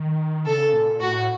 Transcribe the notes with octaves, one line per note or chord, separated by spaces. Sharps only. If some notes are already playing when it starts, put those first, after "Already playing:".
Already playing: D#3
C#3 A4
A#2
A2 F#4